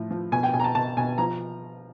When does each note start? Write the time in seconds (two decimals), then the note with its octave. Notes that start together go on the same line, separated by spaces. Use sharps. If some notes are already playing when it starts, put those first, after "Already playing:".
Already playing: A2 F3
0.11 F3
0.32 B2 G#5
0.43 G5
0.54 B2 G#5
0.60 A#5
0.64 A5
0.75 B2 A5
0.97 B2 G#5
1.18 F3 A#5